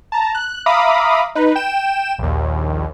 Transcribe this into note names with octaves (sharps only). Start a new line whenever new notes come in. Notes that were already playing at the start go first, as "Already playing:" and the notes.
A5 A#5
F#6
E5 F5 A#5 B5 D6 D#6
D#4 B4
G5 E7
A#1 D#2